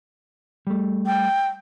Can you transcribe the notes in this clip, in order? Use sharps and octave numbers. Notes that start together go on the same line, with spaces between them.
G3 A3
G5